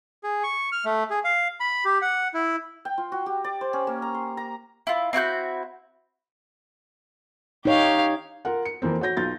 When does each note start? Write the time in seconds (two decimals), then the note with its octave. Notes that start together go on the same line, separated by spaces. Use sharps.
0.24 G#4
0.44 C#6
0.72 F6
0.85 A3
1.10 G#4
1.24 F5
1.60 B5
1.85 G4
2.02 F#5
2.34 E4
2.85 G5
2.98 F4
3.12 F#4
3.26 G4
3.44 D5
3.61 C5
3.73 C#4
3.87 A#3
4.02 A#5
4.15 C6
4.37 A#5
4.87 E4 F4
5.13 C4 E4 F#4 G6
7.65 D#4 G4 C#5 F5
8.45 F4 A#4 F#5
8.65 C#7
8.82 F2 E3 A#3 C4
9.01 F#4 C#5 G6 A#6
9.17 B1 F4 G6 A6